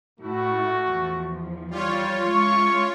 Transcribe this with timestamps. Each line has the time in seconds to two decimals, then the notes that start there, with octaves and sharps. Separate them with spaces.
0.20 A2 A3 E4 F#4
0.86 E2 F3
1.71 G3 F4 C#5
2.27 G#3 C#4 E4 C#6